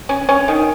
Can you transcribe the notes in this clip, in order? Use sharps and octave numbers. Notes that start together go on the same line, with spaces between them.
C#4
C#4
D#3